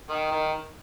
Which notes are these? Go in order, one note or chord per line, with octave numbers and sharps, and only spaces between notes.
D#3
D#3